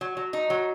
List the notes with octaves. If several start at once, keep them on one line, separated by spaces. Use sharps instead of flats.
F#3
F#3
D#4
F#3